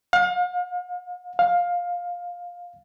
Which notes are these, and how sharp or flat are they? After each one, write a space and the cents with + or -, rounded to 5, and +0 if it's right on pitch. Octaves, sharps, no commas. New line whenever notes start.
F5 +40
F5 +15